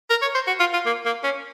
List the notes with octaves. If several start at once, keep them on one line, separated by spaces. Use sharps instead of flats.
A#4
C#5
C5
F#4
F4
F4
A#3
A#3
C#4